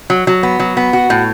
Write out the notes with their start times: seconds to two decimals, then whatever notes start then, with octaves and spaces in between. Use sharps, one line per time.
0.10 F#3
0.27 F#3
0.43 B3
0.60 F#3
0.77 B3
0.93 F#4
1.10 A2